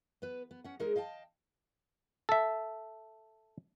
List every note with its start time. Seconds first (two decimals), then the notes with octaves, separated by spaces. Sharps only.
0.22 B3 B4
0.51 B3
0.64 C#4 F#5
0.80 G#3 D#4 G#4 A#4
0.96 D#5 F5 G5 A5
2.29 A4 E5